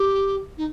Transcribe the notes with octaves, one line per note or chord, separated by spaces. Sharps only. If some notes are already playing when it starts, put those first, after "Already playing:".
Already playing: G4
D#4